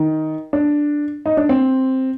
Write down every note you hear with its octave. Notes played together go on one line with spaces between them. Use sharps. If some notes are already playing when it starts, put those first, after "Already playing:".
Already playing: D#3
D4
D#4
D4
C4